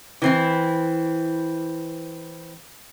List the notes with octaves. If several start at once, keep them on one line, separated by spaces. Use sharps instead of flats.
E3 C4 E4